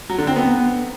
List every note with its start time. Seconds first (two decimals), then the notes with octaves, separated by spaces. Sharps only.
0.09 F#3
0.18 D3
0.27 C4
0.36 B3